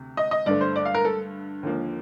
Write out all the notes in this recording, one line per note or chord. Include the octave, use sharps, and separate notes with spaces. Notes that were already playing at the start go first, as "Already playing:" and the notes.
Already playing: D2 C3
D#5
D#5
G2 D3 A3 D5
C5
D5
F5
A#4
A4
D#2 D3 F3 A#3